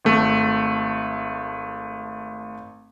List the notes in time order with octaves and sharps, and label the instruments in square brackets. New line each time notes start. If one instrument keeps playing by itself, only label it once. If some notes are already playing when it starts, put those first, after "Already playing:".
[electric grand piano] G#1 A3